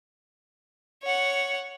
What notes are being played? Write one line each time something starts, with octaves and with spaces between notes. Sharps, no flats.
C#5 F#5